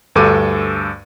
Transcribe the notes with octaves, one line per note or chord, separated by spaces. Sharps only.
D2 G2 A4 D6 D#7